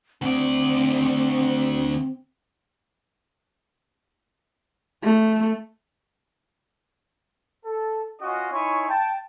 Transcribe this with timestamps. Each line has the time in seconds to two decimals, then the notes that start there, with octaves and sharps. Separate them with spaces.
0.22 D2 C4 D5
5.03 A3
7.65 A4
8.21 C#4 F4 F#4 D#5
8.52 D#4 E4 C#5 G#5 C6 C#6
8.89 G5 A5